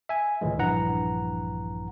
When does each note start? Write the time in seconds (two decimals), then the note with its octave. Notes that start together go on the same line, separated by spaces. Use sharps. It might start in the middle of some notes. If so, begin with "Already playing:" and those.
0.09 E5 G#5
0.41 C#2 A2 D#3 E3 G#3
0.58 A#1 G2 E3 F#5 A#5